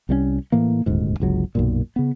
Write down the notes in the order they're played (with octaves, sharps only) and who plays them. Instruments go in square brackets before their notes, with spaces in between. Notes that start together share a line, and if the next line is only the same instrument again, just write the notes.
[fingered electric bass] C2 G3 A3 C#4
A2 E3 A#3
D#1 D2 G#2
G1 C#2 F#3
B1 F#2 A#2
C#3 B3